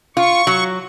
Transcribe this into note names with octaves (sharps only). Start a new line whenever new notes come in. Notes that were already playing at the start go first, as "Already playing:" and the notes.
F4 C#6
F#3